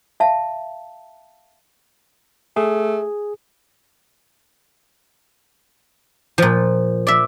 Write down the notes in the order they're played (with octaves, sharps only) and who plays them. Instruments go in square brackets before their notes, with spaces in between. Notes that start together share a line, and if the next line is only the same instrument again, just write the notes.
[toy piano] E5 F5 A5
[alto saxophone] A3 [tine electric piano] G#4
[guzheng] A#2 F3
D5 E5